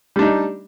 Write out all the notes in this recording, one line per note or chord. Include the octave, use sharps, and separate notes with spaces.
G3 D4 D#4